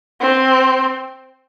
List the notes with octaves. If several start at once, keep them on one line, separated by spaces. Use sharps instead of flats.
C4